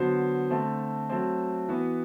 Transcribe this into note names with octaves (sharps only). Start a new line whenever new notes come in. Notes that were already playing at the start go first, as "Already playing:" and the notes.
Already playing: D3 F#3 B3 F#4 C5
D3 A3 C4
F#3 A3 C4
E3 B3 F#4